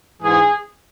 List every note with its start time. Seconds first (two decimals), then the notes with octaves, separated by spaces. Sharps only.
0.23 G#2 E3 G#4